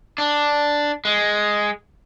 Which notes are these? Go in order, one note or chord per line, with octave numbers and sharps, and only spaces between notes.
D4
G#3